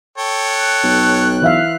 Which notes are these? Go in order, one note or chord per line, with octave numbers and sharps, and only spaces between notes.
A4 C#5 G5
F#6
B1
E3 E5 F5